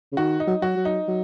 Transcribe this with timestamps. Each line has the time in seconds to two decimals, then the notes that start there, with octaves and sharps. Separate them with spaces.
0.12 C#3
0.17 D#3 F#4
0.40 D#4
0.47 F#3
0.62 F#3 F#4
0.77 F#3
0.85 D#4
1.08 F#3